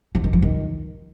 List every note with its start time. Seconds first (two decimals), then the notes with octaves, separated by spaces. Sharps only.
0.15 F3
0.24 D#3
0.33 F3
0.42 D#3